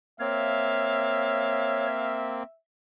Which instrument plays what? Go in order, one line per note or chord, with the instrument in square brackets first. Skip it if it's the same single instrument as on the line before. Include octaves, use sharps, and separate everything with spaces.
[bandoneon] A#3 C4 [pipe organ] C#5 [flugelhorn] E5 [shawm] F5